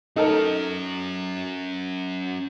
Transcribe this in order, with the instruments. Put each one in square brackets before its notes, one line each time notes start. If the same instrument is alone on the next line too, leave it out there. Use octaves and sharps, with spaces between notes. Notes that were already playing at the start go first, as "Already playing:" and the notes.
[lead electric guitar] F#3 C#4 [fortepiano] D#4 A4 A#4